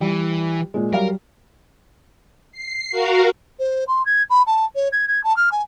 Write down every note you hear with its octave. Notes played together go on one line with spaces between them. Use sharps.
E3 G3
A#2 G#3
F#3 G3 A#4 F5
C7
F#4 A#4 F5
C5
C6
G#6
B5
A5
C#5
G#6
G#6
A5
F6
G#5